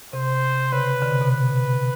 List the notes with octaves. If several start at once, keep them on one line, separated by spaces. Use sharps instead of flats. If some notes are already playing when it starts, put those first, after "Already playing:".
C3 C5
C#3 B4
D3
C3
B2
B4